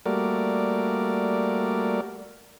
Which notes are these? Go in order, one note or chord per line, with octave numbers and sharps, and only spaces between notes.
G3 A3 A#3 F#4 A#4 D5